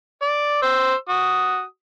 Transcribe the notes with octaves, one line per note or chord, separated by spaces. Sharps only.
D5
C5 E6
F#4 D#6